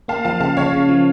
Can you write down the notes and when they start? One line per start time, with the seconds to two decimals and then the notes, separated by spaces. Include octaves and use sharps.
0.08 A#3 F5 A5
0.24 F3 F5 A5
0.40 C#3 F5 A5
0.57 C#3 C#5 F5
0.73 C#3
0.89 F3